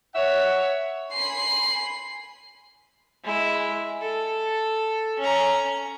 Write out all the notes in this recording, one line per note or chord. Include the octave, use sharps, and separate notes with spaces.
C#5 E5 F#5
G#5 B5 C6 C7
G#3 E4
A4
C#4 A#5